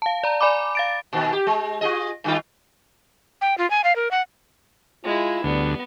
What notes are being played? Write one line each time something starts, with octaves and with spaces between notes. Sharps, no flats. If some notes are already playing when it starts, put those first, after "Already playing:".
F5 A5
D5 A#5
D5 G#5 B5 D6
F5 A6 D7
A#2 D#3
G4
G#3
F4 G#4 D#5
G2 D#3 F4
G5
F4
G#5
F5
A#4
F#5
G#3 E4 F4
D2 G3 B3